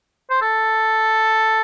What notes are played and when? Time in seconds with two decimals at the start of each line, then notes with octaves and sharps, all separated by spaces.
0.30 C5
0.41 A4